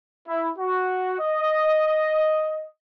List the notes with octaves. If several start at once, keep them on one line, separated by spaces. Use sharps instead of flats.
E4
F#4
D#5